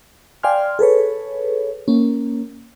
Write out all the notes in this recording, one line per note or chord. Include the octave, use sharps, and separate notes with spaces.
D5 F5 G5 G#5 C6 F6
G#4 A4 B4 C#5
A#3 C#4